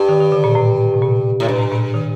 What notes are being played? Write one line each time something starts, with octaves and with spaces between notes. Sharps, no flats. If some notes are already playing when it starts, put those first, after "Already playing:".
Already playing: G2
D#3
D#3
D3
A#2
A2
C3
A#2
A2
G2 A#2
A2
A#2
D#3